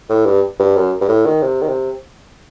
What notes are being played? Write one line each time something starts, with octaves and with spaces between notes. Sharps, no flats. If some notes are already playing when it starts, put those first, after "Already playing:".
A2
G2
G2
F#2
G2
A2
D#3
C3
D#3
C3